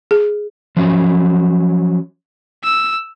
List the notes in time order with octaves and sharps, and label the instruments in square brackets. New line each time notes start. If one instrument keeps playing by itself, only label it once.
[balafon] G#4
[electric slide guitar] F3 F#3 C#4 C#5
[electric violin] E6